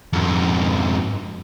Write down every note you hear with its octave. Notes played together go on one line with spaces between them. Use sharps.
F2 G#2